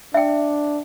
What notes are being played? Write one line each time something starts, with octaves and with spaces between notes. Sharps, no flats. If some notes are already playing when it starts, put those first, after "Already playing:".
D4 E5 G5